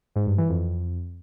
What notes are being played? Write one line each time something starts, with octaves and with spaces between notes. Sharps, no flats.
G#2
G2
E3
F2